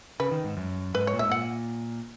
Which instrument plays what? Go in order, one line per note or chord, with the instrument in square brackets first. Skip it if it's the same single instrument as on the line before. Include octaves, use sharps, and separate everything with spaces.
[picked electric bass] C#3 [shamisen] B4
[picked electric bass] D#3
G#2
F#2
[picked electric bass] G#2 [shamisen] B4
[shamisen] C#5
[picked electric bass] A#2
[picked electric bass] G#2 [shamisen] E5
[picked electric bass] A#2 [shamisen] F#5